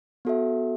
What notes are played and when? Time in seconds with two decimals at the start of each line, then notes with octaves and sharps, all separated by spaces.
0.25 B3 F#4 A4 E5